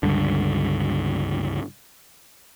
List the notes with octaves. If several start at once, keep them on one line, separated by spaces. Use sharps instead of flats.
C#2 G2 D3